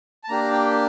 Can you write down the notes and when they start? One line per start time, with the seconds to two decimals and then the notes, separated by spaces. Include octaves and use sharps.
0.24 A5
0.28 A#3 D4 G4 A#5
0.53 G5